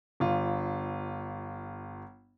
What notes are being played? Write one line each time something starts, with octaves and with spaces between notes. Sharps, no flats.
G1 F4